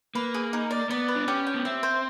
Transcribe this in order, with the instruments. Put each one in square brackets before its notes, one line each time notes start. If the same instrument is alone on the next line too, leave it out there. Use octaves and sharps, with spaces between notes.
[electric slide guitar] A#3 [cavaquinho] B4
[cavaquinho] G#4
D#4
D5
[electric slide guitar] B3 [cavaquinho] D5
[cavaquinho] B4
[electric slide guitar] D4
[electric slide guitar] C#4 [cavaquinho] G4
[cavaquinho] G5
[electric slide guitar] B3
[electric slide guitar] C4 [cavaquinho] E5
[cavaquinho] C5